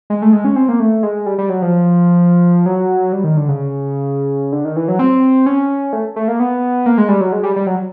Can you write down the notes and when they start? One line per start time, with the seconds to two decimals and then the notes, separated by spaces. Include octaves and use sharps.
0.10 G#3
0.22 A3
0.33 G#3
0.45 C#4
0.56 C4
0.69 A#3
0.80 A3
1.03 G#3
1.26 G3
1.38 G3
1.49 F#3
1.62 F3
2.66 F#3
3.12 G3
3.24 D#3
3.37 D3
3.48 C#3
4.52 D3
4.65 D#3
4.76 E3
4.88 F#3
4.99 C4
5.47 C#4
5.93 A3
6.16 A3
6.28 A#3
6.40 B3
6.86 A#3
6.98 G#3
7.09 G3
7.21 F#3
7.32 G#3
7.44 G3
7.56 G3
7.67 F#3